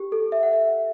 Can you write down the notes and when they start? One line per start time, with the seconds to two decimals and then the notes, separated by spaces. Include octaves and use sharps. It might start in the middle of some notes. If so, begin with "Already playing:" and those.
Already playing: G4
0.12 A4
0.32 E5
0.43 F#5
0.53 E5